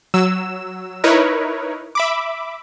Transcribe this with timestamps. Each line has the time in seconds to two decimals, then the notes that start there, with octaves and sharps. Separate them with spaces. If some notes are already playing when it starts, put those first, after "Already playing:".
0.14 F#3 E6 E7
1.04 D#4 E4 A#4 B4 C#5
1.95 E5 B5 D6